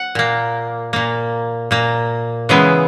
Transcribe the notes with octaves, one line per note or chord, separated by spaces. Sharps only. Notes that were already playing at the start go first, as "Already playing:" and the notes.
Already playing: F#5
A#2 A#3
A#2 A#3
A#2 A#3
C#3 E3 G#3 B3